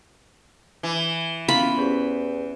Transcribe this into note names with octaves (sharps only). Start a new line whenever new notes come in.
E3
B3 C#4 E4 F4 B5
E2 C#4 G4 C5